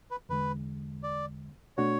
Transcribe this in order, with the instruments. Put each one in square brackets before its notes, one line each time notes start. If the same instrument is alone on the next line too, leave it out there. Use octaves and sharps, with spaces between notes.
[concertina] B4
[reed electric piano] E2 D3 G#3 [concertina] B4
[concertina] D5
[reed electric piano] B2 A3 D4 F#4 [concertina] C#5